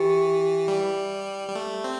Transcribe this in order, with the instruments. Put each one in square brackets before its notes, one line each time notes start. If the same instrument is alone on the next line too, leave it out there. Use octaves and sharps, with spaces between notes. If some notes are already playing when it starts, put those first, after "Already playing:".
Already playing: [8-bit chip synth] E3 [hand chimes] G4
[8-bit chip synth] G3
G3
A3
C4